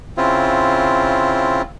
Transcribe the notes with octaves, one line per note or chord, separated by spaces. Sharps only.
C#3 C4 E4 F4